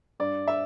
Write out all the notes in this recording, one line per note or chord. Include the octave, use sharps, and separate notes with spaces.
G2 D5
E5